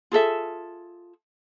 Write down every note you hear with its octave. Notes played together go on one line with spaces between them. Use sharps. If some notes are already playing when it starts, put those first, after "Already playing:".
F4 G#4 A4 E5